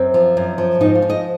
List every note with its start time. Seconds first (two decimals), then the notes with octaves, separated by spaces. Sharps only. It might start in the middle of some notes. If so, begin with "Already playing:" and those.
Already playing: F#2 C4
0.14 F3
0.37 F#2
0.58 F3
0.80 G#2 D#4
0.95 F4
1.02 F3
1.10 D#5